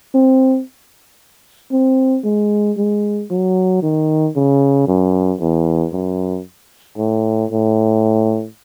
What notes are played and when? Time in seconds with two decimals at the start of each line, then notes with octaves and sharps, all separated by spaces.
0.14 C4
1.71 C4
2.24 G#3
2.77 G#3
3.30 F#3
3.82 D#3
4.36 C#3
4.87 F#2
5.40 E2
5.93 F#2
6.98 A2
7.51 A2